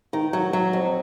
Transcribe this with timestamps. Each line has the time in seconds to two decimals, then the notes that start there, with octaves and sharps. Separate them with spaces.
0.13 D#3
0.33 F#3
0.53 F#3
0.73 F2